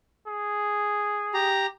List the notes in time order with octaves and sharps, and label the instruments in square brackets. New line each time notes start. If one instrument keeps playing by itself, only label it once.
[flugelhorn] G#4
[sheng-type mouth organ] G4 A#5